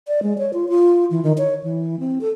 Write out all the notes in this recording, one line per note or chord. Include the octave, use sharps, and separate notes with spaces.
D5
G#3
C#5
F4
F4
E3
D#3
C#5
E3
C4
A4